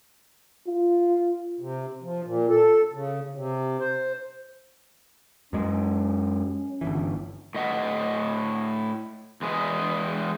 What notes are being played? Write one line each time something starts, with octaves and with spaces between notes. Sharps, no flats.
F4
C3
F3
A#2
A4
C#3
C3
C5
F#2 G#3 C#4
G1 C#2 E3
A2 D#5 F#5
E2 G#3 G#4 B4 D#5